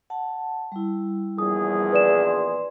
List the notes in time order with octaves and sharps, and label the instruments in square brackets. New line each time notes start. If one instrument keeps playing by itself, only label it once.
[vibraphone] F#5 A5
G3 E4
[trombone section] A#1 E2 G#4 [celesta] D#6
[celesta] B4 D5 E7
[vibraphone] C6